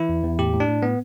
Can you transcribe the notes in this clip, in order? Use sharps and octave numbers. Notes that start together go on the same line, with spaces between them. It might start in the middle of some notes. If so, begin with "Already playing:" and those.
Already playing: E3 E4
E2
E2
A2 G4
A2
D4
A2
A2 B3